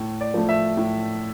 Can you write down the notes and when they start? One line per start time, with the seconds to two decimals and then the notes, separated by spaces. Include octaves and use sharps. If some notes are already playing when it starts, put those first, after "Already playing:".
Already playing: A2
0.21 D5
0.34 F3 A3
0.49 E5
0.77 A2